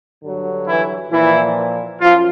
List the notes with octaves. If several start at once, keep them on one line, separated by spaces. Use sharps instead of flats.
G2 D3 F#3
E3 E4
A#2 E3 F3 E4
F#2 F3 F4